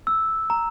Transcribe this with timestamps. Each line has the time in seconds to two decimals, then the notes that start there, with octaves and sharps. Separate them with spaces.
0.07 E6
0.50 A#5